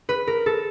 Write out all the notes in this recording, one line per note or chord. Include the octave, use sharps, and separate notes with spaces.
B4
A#4
A4